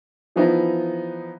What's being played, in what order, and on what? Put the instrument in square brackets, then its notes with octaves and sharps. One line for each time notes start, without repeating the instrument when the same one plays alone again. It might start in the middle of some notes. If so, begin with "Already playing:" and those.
[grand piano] E3 F3 B3 D#4 E4